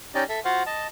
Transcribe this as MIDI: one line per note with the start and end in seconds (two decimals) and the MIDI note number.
0.15 0.24 61
0.15 0.24 63
0.15 0.24 67
0.15 0.24 74
0.15 0.24 75
0.29 0.40 69
0.29 0.40 76
0.45 0.63 65
0.45 0.63 66
0.45 0.63 72
0.45 0.63 77
0.45 0.63 78
0.66 0.87 75
0.66 0.87 81